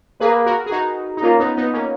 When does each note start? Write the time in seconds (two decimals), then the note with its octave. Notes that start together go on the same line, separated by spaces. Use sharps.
0.20 A#3 G#4 B4
0.46 F#4 A#4
0.66 G#4
0.71 D#4 F#4
1.17 D#4
1.23 A#3 C#4 F4
1.39 B3 D#4
1.57 B3 D#4
1.73 A#3 C#4